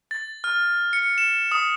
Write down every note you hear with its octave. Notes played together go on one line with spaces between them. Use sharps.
A6
F6
C#7
E7
D#6